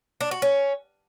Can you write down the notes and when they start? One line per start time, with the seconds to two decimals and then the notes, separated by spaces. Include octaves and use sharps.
0.21 D4
0.31 F#4
0.42 C#4